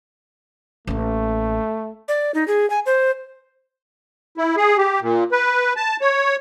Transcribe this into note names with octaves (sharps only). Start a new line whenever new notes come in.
A1 A3 A#3
D5
D#4
G#4
G#5
C5
E4
G#4
G4
A#2
B4
A5
C#5